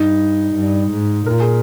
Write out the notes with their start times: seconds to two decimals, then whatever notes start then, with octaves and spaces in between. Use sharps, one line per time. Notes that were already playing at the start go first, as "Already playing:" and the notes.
Already playing: G2 D#4
0.55 G2
0.91 G#2
1.26 A#2 A#4
1.40 G#4